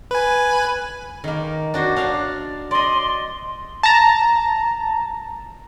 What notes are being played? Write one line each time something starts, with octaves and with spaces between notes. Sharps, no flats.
B4 G#5
D#3 A#3
D4 F#4 C5
D4 F5 A5
D5 D#5 C6
A5 A#5